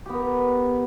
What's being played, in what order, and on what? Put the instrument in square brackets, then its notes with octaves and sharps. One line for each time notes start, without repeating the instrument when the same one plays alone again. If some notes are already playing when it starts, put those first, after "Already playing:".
[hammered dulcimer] G4
B3
A#4